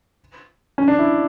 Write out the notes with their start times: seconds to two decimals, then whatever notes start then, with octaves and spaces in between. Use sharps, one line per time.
0.78 C#4
0.88 D4
0.99 E4